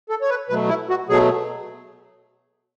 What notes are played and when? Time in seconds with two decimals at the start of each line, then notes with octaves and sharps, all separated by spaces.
0.09 A4
0.21 C#5
0.29 B4
0.49 B2 F#3 A3 B4
0.69 E4
0.89 F#4
1.09 B2 F#3 A3 G#4